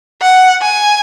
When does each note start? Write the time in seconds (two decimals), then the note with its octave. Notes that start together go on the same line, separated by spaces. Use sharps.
0.22 F#5
0.62 G#5